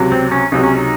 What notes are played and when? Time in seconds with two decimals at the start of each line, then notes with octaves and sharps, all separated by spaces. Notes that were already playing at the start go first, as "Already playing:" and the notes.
Already playing: C#2 C3 F#3
0.12 C4
0.32 C#4
0.52 C#2 C3 F#3 D#4
0.63 C#4
0.75 D#4